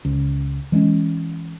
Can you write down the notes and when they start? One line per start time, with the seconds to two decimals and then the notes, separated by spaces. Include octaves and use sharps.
0.05 C#2
0.72 E3 G#3 A3 C#4